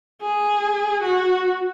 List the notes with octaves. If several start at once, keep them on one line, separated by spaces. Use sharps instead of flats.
G#4
F#4